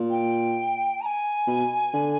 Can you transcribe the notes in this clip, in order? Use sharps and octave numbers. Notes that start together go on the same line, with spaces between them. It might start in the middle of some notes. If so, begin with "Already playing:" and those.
Already playing: A#2
G5
A#5
G#5
B2
D3